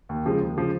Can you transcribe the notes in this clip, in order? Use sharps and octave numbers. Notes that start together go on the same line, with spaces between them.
D#2
C#3 F3 G#3
D#2
C#3 F3 G#3